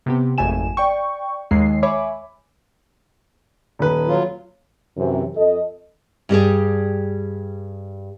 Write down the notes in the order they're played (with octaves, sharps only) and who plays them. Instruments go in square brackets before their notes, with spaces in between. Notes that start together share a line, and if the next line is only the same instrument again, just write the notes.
[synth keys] C3 B3 G4
G#1 F2 A3 G#5 E7
D5 G5 C#6
D#2 D#3 G#3 C7
C#5 E5 G#5 B5 D6
[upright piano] D#1 B4
[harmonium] F#3 F4
[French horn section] F#2 C3 E3
F2 A4 D#5
[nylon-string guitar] G2 G3 G4 G#4